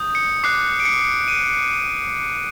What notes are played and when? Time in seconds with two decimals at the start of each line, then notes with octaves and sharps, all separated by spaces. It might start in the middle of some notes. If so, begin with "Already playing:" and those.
Already playing: D#6 G6
0.15 C#7
0.44 D6 F#6 C7
0.80 D7
0.85 C#7
1.28 D#7